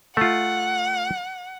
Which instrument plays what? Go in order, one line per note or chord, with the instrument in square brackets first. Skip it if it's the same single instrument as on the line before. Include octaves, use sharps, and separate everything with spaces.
[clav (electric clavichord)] A3 F4 [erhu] F#5